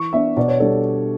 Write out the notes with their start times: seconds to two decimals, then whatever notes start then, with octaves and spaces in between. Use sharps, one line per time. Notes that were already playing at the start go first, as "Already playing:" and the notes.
Already playing: E3 C#6
0.13 B3 D4 E5
0.37 B2 D5
0.48 C#5
0.60 G3 D4 A4